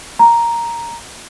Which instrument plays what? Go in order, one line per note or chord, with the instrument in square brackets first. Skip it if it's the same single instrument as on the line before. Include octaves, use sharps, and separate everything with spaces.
[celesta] A#5